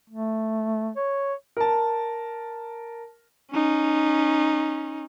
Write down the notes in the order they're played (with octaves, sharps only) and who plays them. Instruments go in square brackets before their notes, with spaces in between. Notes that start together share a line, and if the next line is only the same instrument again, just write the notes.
[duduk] A3
C#5
[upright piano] A#4 A5
[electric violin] C#4 D#4